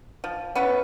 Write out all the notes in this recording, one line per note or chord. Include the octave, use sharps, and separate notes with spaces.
F3
B3 C#4 E4 B4